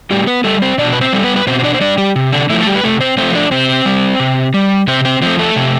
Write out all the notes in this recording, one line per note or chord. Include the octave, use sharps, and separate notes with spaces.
A2 G3 G4
B3 B4
G3 A3 A4
C4 C5
B2 D4 D5
B4
C4 C5
G3 A4
B3 B4
B4
B2 C4 C5
C5
D4 D5
C5
G3 D4 D5
G3 G4
C3
D3 D4
E3 F3 A3 E4
A4
G3 G4
B4
C3 A3 A4
C4 C5
F3 A3 C4 C5
D4 D5
C3 C4 C5
G3
C3
G3
C3 C4 C5
C4 C5
F3 A3 C4 C5
A3 A4
C3